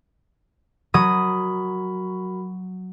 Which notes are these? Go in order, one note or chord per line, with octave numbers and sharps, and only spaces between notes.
F#3 F#4 A#4 B5 D#6